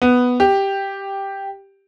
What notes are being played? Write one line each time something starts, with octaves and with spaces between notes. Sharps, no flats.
B3
G4